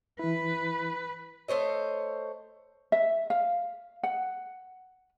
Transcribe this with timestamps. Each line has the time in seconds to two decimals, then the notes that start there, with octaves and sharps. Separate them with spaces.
0.19 E3 E4 B4
1.48 A3 C5 C#5 D#5
2.92 E5
3.30 F5
4.03 F#5